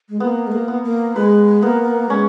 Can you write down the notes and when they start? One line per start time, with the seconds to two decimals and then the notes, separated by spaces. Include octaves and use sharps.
0.09 G#3
0.20 A#3 B3
0.47 G#3
0.52 A#3
0.68 B3
0.84 A#3
1.16 G#3 B4
1.62 A#3 B3
2.09 G#3 C#4